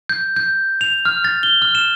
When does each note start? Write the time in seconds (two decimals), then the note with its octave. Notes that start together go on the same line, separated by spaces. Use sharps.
0.09 G6
0.36 G6
0.81 F7
1.05 F6
1.24 A6
1.43 G7
1.62 F6
1.75 E7